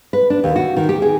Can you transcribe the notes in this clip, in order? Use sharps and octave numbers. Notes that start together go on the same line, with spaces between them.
B4
D4
D#2
F#4
D#3
G4
G#4